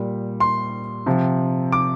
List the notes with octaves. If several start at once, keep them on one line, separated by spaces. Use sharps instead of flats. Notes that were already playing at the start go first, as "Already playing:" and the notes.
Already playing: A#2 G3
C6
C3 F3
D6